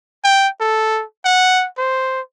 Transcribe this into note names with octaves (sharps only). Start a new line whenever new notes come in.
G5
A4
F#5
C5